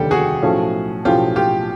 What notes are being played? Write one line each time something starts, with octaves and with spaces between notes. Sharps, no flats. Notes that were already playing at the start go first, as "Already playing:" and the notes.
Already playing: F1 D#2 D3 G3 G4 A4
F#4 G#4
B1 A2 F3 A3 C#4
B1 A2 F3 A3 C#4 F4 G4
F4 G4